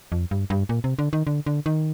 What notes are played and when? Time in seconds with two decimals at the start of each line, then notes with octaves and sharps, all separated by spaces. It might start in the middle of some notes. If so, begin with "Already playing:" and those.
0.12 F2
0.31 G2
0.50 G2
0.69 A#2
0.84 C3
0.99 D3
1.13 D#3
1.27 D3
1.46 D3
1.66 D#3